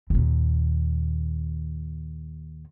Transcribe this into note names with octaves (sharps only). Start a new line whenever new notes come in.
D#2 A#2